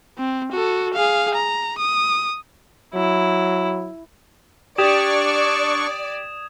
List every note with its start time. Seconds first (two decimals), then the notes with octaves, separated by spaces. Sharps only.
0.18 C4
0.52 F#4 A4
0.94 G#4 F5
1.35 A#5
1.78 D#6
2.94 F#3 E4
4.78 D4 G4 D5 C#6 D#6 G#6 E7